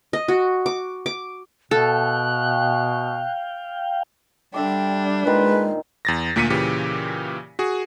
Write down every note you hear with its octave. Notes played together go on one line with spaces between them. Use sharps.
D#5
F#4
D6
D6
B2 A4 F5 G5 F#6
D3 G3 D4 E5 G5 D6
A#2 D#3 G#3 B4 C5
E2 A6 A#6
D2 A#2 A#3 B6 C#7 D#7
A#2 C#3 E3 G4
F#4 G#4